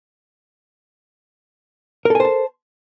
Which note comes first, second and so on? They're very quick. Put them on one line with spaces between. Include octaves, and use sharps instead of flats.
A#4 A4 G#5 C5 A5